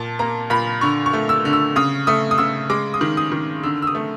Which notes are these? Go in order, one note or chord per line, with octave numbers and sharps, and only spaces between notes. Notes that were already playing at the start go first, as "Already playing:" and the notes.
Already playing: A#2 A5
A#3 A#5
A#2 B5
D3 C#6
C#6
A3
E6
D3
E6
C#3 D#6
A3 D#6
D#6
C#3 E6
G#3 D6
D#6
D#3
D#6
D#3
D3 E6
E6
D#6
A3